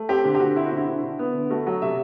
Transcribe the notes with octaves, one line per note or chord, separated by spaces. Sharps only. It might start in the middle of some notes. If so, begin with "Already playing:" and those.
Already playing: A3
C4 G4
D3
G4
D3 F#4
C4 E4
F#4
D3
E4
D3
D3
B3
D3
A3 F#4
F#3
C3 E5